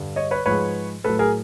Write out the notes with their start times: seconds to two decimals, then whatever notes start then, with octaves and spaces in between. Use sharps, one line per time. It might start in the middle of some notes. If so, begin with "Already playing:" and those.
Already playing: G2 D3 G3
0.16 C#5 D#5
0.31 B4 C#5
0.46 G#2 F3 G#3 B4 C#5
1.04 A2 F#3 A4 B4
1.19 G#4 A#4